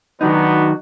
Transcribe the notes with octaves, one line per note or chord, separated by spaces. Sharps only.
D#3 F#3 B3 D4 D#4 F#4